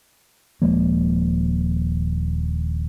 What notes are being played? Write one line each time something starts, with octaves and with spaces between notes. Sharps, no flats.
D#1 F3 G#3 A#3